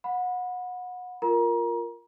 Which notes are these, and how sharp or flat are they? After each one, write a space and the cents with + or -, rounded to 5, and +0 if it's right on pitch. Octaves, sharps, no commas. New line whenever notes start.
F#5 -30 B5 +0
F4 +0 A#4 +0 A#5 +30